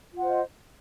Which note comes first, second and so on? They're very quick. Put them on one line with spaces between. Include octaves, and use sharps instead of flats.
F4 F#5 C5 D#5